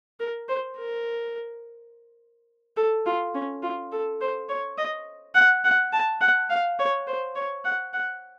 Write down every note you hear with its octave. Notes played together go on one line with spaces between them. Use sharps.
A#4
C5
A#4
A4
F4
C#4
F4
A4
C5
C#5
D#5
F#5
F#5
A5
F#5
F5
C#5
C5
C#5
F#5
F#5